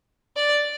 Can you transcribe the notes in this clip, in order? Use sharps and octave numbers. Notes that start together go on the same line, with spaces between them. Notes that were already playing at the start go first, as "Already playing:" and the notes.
D5